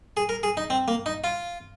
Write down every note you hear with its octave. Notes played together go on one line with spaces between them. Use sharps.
G#4
A#4
G#4
D#4
C4
A#3
D#4
F4